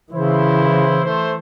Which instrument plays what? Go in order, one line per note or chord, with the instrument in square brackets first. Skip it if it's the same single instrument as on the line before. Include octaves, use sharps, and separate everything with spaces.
[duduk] C#3 [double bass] E3 [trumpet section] E4 C5
[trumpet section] A3 C5